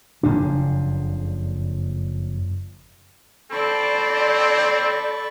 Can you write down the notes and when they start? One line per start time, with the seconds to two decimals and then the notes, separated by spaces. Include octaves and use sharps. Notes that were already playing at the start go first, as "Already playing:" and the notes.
0.23 F#1 F2 C#3 D4
3.52 C4 A4 D5 A5 B5 C#6